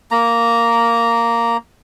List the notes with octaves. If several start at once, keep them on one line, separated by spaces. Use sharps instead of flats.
A#3 A#5